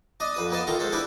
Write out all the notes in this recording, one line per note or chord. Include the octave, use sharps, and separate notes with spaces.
D4 D#5
F2 B4 D#6
A#3 B3 D#5 A5
D#3 F4 A4 A#5
G#3 A4 C5
D4 E4 G4 B4